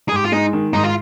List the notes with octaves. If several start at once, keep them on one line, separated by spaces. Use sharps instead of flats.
G#4
G#2 G4
F4
G#3 D#4
D#3
G#2 D#4
F4